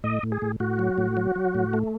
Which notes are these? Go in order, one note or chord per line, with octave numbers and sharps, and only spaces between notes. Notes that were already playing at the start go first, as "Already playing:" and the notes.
A2 D#5
A2
G#4
A2
A2 F#4
F#3
A2
F#3
F#3
A2
A3